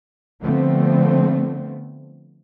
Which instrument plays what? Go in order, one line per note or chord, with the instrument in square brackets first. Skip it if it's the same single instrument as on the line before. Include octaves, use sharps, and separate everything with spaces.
[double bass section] D3 F3 A3 B3 C4